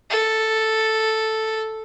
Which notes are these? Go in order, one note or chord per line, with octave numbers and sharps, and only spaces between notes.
A4